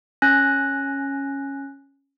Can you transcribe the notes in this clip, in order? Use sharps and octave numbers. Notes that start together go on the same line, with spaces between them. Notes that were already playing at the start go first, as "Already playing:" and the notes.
C#4 G#5 F#6 A#6